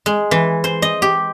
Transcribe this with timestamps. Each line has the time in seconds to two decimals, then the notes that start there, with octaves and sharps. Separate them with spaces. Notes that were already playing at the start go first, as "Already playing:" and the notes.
0.06 G#3
0.31 E3
0.64 C5
0.82 D#5
1.02 G4